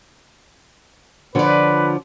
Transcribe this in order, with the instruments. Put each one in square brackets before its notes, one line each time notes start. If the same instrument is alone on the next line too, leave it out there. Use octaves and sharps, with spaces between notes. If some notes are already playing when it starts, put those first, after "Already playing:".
[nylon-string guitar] D3 F3 [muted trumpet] B4 [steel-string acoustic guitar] C#5 D5